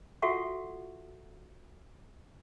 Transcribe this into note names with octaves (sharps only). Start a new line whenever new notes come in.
F4 F#4 A4 E5 F#5 C#6